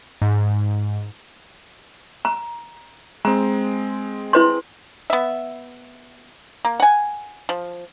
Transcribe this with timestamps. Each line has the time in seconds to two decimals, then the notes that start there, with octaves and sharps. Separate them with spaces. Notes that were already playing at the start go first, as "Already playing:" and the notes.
0.22 G#2
2.25 A#5
3.25 G#3 C4 A#5
4.33 E4 B4 C6
5.10 B3 E5
6.65 A#3
6.80 F#5 G#5
7.49 F3